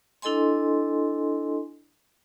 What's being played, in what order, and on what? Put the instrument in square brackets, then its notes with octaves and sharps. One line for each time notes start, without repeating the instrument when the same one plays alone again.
[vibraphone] D4 E4 A4 D#5 G#5 C6